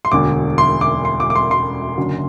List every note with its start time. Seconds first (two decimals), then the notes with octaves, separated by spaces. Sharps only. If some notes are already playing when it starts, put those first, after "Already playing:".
0.05 C6
0.12 E1 D2 D3 D6
0.58 C6
0.81 D6
1.05 C6
1.20 D6
1.30 D6
1.35 C6
1.51 C6
1.98 F#1 F#2 D3